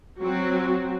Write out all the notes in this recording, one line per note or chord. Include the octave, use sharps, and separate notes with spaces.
F#3 C4 F#4